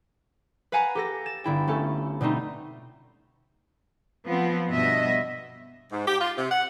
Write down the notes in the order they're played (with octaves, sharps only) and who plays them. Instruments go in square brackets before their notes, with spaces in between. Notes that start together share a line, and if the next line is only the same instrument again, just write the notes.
[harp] B4 F5 F#5 G#5 A#5 F#6
G4 A4 A#6
A6 E7
G1 E4 G5
A3 C#4 A4
B2 G3 A3 C4 D#4
[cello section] F3 B3 C4
G2 B2 B3 D#5 E5
[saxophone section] G#2
G4
F4
C3
F#5